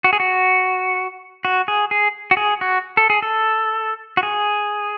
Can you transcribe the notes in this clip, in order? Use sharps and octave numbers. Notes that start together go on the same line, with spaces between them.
F#4
G#4
F#4
F#4
G#4
G#4
F#4
G#4
F#4
A4
G#4
A4
F#4
G#4